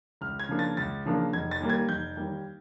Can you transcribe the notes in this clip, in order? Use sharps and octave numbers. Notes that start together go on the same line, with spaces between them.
C#2 F6
G#6
C#3 F3 A#3 D4
A6
C#2 A6
C#3 F3 A#3 D4
F1 G#6
A6
D#2 D#3 G3 A#3
G#6
F1 G6
D#2 D#3 G3 A#3